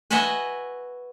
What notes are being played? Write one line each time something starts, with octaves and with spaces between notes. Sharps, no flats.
F#4 B4 D#5 E5 F#5 G#5